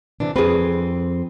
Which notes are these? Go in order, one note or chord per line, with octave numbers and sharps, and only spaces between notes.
C3 E3 D4
F2 G#2 C4 G#4 B4